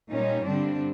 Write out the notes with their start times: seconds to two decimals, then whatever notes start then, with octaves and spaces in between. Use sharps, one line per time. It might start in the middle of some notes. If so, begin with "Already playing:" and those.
0.13 A#2 G3 A#3 C#4 D#4
0.47 G2 D3 G3 C4 D4